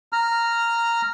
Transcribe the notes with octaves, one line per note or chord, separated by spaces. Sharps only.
A#5 F6